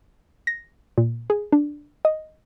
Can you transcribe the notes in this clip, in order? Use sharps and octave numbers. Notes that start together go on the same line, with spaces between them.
A#6
A#2
G#4
D4
D#5